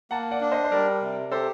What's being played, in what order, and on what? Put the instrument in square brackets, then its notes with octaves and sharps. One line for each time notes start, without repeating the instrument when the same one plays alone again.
[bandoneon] A#3 [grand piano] F#5 A5
[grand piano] D5 F#5
[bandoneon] D4
[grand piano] C5 D#5
C5
[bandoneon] G3 [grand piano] A#4 D5
[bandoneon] C3
[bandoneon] G4 [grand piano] A4 C5